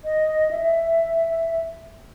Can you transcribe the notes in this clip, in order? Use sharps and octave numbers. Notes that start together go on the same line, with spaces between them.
D#5
E5